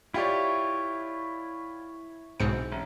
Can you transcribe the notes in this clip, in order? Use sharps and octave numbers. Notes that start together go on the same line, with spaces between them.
E4 F4 G4 C#5 D5
B1 G#2 C4 C#7
A1